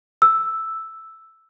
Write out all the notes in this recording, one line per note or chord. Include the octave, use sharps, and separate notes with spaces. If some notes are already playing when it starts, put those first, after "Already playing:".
E6